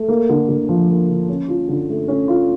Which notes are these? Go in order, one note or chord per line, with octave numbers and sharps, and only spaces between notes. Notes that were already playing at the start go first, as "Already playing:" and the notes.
Already playing: A3
A#3
D3
D3
F3
A#3
D3
C#4
F4
D3
A3
C#4
F4